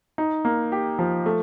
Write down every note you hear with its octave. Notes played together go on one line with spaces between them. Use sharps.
D#4
A#3
G4
F3
A3